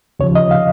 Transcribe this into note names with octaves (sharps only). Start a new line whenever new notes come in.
D#2 C#3 F3 C#5
D#5
F5